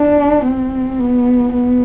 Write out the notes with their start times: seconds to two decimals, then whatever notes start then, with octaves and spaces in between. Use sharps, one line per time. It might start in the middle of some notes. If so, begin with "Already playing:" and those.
Already playing: D4
0.44 C4
0.99 B3
1.53 B3